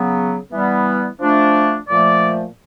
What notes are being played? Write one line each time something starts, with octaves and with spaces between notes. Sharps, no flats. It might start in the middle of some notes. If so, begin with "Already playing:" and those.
Already playing: C#3 F#3 B3
E3 G3 B3
F3 A3 D4
A#2 F3 A3 D5